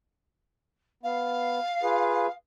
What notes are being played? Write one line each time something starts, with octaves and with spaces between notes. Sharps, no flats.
B3 F5
F4 G#4 B4